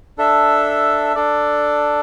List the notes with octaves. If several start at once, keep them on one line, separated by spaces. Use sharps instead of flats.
D4 A4 E5
D4 A4 D5